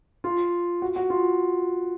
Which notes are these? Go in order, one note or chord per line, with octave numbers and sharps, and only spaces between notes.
F4
F#4
F#4
F4